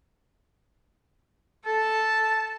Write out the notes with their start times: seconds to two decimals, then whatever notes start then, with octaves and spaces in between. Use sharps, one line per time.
1.66 A4 A5